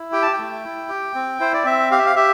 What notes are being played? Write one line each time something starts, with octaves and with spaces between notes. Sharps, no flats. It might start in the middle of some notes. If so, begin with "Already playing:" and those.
Already playing: E4
G4 G5
A5
G5
A3
E4
G4
C4
E4 C5
D5
C4 E5
G4 F5
E5
F5
G4 E5